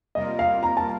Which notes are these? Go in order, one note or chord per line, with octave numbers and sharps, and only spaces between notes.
C3 G3 A#3 F4 A#4 D#5
F5
A#5
A5